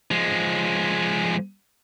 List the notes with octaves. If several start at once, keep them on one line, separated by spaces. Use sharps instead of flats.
F3 G#3